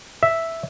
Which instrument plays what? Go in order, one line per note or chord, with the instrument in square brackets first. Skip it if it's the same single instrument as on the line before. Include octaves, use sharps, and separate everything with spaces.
[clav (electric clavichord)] E5